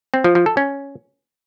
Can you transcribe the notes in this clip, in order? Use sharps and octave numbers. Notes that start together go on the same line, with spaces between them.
C4
F3
F3
A4
C#4